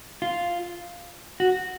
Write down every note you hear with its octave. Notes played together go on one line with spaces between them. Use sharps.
F4
F#4